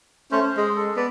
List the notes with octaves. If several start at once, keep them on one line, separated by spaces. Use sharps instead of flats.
A3 C#4 C5
C5
G#3
A4
B3 D5